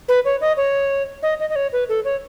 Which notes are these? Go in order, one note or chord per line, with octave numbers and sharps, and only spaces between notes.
B4
C#5
D#5
C#5
D#5
D#5
D#5
C#5
B4
A4
C#5